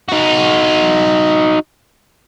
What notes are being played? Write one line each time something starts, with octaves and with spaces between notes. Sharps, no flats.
D#4 F#4